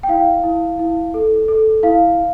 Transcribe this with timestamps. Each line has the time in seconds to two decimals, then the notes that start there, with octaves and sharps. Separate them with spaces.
0.03 G5
0.08 E4 F5
0.43 E4
0.79 E4
1.14 A4
1.48 A4
1.83 E4 F5